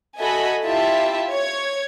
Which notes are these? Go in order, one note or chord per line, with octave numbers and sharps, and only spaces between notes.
F#4 A4 D#5 E5 G#5 B5
E4 F4 G4 E5 A5
C#5 G#6